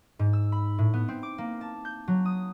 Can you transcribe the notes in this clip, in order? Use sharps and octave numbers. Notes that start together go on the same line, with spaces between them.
G#2
E6
B5
A2
B3
C4
D6
A#3
A5
G6
F#3
D#6